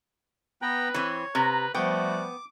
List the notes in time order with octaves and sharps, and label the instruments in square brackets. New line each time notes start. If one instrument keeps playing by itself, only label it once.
[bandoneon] B3 G5 A#5 [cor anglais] B4
[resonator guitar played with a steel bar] E3 C4 [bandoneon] C#5
[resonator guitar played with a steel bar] C3 [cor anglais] B4 [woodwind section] A#5
[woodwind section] F3 G3 A3 [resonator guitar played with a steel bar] B3 G5 [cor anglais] F#4 [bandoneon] D6